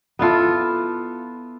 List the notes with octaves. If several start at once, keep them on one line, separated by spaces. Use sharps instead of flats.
B3 E4 F4 A4